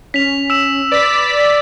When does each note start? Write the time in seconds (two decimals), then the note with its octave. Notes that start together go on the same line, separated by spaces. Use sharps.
0.14 C#4 B6 F7
0.50 E6 E7
0.91 B4 D5 B6